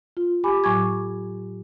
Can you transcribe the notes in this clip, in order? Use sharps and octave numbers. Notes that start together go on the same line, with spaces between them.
F4
G4 G#5 B5 D6
A2 F#3 G#5 C#6 D6 G#6